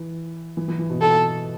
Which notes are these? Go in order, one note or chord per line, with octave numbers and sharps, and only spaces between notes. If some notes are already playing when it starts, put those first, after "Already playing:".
Already playing: E3
E3
E3
E3
B2
B2 A4